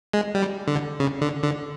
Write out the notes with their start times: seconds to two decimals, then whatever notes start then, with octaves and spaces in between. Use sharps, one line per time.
0.13 G#3
0.35 G3
0.68 D3
1.00 C#3
1.21 D3
1.43 D3